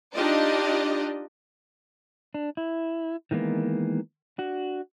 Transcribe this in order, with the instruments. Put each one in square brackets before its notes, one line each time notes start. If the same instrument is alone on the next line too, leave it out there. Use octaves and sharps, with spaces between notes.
[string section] D4 D#4 F4 G4 D5 D#5
[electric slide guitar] D4
E4
D#3 E3 G#3 A#3 B3
D4 F#4